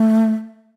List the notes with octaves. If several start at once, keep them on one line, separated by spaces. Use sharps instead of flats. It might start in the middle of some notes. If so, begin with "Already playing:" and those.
Already playing: A3